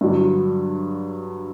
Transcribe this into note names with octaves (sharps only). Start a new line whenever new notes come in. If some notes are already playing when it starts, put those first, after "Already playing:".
G2 D3 F#3